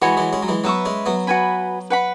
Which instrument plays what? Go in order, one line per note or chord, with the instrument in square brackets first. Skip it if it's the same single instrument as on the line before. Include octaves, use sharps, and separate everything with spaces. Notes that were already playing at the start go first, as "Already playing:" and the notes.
[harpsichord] E3 G#3 [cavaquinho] F#4 C#5 G#5 B5
[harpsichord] E3 G#3
G#3 C#4
F#3
E3 G#3
[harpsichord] F#3 B3 [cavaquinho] B4 E5 C#6
[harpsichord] G#3 C#4
F#3 B3
[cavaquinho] F#4 B4 G#5 B5
B4 F#5 B5